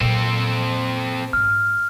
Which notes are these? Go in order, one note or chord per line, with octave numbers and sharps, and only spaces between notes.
A#2 F#3 C4 A4
G#1 G#3 F6